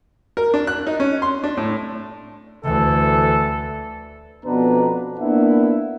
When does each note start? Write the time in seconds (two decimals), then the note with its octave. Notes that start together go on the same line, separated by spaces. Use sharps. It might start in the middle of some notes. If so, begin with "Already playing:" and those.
0.37 A#4
0.54 D4
0.67 F#6
0.87 D#4
1.00 C#4
1.22 C6
1.44 D4
1.57 A2
2.64 D2 E3 A4
4.46 F2 B2 B3 D4 B4 A#5
5.20 A#3 B3 D4 E4 E5 F#5